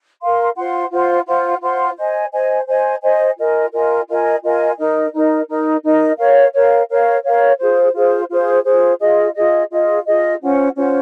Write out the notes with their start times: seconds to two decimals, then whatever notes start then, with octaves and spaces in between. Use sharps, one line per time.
0.21 A#4 F5 C6
0.56 F4 C5 F#5 C6
0.92 F4 C5 F#5 C6
1.27 F4 C5 F#5 C6
1.62 F4 C5 F#5 C6
1.97 C5 D#5 G#5
2.33 C5 D#5 G#5
2.67 C5 D#5 G#5
3.02 C5 D#5 G#5
3.38 F4 A#4 D#5 G#5
3.73 F4 A#4 D#5 G#5
4.08 F4 A#4 D#5 G#5
4.43 F4 A#4 D#5 G#5
4.78 D#4 A#4 D#5
5.13 D#4 A#4 D#5
5.48 D#4 A#4 D#5
5.84 D#4 A#4 D#5
6.19 A#4 C#5 F5
6.54 A#4 C#5 F5
6.90 A#4 C#5 F5
7.24 A#4 C#5 F5
7.60 F4 G#4 C5
7.95 F4 G#4 C5
8.30 F4 G#4 C5
8.65 F4 G#4 C5
9.00 F4 G#4 D#5
9.35 F4 G#4 D#5
9.70 F4 G#4 D#5
10.06 F4 G#4 D#5
10.41 C#4 F4 C5 F#5
10.76 C#4 F4 C5 F#5